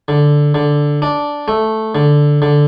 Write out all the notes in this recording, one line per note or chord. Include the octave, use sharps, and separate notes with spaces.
D3
D3
D4
A3
D3
D3